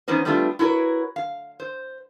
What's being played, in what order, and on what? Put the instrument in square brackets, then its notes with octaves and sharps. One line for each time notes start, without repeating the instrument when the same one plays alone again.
[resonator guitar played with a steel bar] E3 B3 C#4 D#4 C5
G3 A3 B3 D4 D#4 F4
E4 F#4 A#4 B4 C#5
F5
C5